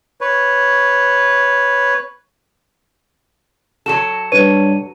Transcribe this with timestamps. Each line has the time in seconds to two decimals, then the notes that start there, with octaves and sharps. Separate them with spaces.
0.21 B4 C#5
3.86 F#3 F#4 A4 E7
4.32 G3 D4 B4 C#5 D#7